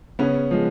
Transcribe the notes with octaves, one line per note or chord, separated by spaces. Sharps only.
C#3 B3 C#4
F3 G#3